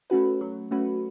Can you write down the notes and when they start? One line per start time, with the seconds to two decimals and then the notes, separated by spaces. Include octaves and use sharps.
0.10 A3 C#4 F#4 B4
0.41 F#3
0.71 A3 C#4 F#4 B4